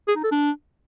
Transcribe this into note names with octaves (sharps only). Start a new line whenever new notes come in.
G#4
D#4
A4
D4